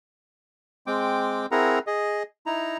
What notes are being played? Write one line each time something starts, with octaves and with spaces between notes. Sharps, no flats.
G#3 C4 G5 D6
C4 E4 G#4 A#4 F#5 A#5
G#4 D#5
D#4 E4 A#5